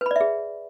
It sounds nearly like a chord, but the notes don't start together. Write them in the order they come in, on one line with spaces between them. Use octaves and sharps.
B4 B5 D5 E5 G#4